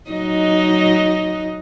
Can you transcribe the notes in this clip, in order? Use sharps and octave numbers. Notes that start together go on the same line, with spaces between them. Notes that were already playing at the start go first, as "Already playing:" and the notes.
F#3 D#4 D#5